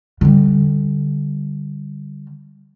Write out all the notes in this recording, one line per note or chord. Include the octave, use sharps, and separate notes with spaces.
D3 G3